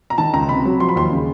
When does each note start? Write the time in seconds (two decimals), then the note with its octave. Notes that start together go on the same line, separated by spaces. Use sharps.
0.10 A#5
0.18 D#3 A5
0.34 C#2 A#5
0.49 C3 B5
0.65 F#3
0.80 F3 C6
0.89 B5
0.96 D#2 C6
1.11 C#3